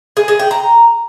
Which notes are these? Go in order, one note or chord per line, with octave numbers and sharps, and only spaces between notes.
G#4
G#4
G5
A#5